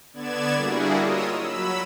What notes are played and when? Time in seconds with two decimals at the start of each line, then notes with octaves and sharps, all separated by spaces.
0.13 D3 B3 D5 G#6 E7
0.55 G3 A#3 D4 E4 F#4 G#4
0.99 F4 A#4 C#5 D#5 D#6 E6
1.37 F#3 B5 E6